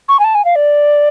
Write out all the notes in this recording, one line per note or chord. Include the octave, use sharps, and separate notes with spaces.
C#6
G#5
A5
G#5
F5
D5